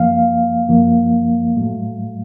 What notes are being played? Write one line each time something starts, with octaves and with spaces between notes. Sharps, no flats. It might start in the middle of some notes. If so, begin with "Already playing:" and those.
Already playing: F#2 F3 A#3 F5
F#2 F3 A#3
A2 F#3 A3